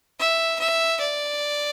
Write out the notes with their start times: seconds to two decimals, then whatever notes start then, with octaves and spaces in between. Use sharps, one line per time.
0.19 E5
0.60 E5
1.01 D5